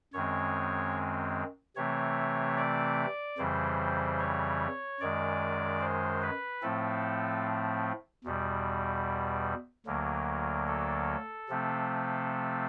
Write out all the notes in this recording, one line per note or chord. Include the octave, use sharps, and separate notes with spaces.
F#2 D#3 G#3 C4 C#5
C3 E3 A3 C4 C#5
D5
F2 C#3 E3 G3 C5
C#5
F#2 D#3 G#3 D5
C5
B4
A2 F3 A3 C4 A4
E2 B2 G3
D2 D3 F#3 A#3
A4
C3 F3 A3 C4